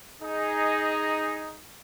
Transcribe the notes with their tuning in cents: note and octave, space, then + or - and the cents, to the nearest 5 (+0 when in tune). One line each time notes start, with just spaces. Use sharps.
D#4 +5 G#4 +0 D#5 -5